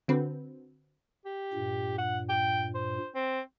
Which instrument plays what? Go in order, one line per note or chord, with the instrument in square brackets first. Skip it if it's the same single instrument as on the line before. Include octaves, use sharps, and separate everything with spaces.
[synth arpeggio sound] D3 C4 F#4 B4
[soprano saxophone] G4
[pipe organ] G2 A#2
[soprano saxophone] F#5
G5
C5
C4